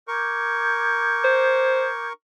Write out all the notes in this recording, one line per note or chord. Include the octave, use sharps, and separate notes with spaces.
A#4 C#6 D6 G6 G#6
C5